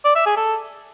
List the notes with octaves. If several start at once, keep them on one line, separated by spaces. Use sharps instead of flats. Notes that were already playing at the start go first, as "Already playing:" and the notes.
D5
E5
G#4
A4